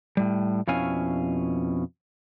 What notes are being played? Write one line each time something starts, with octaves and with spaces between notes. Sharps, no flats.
A2 G3
F2 B2 C#4 E4 F5 G#5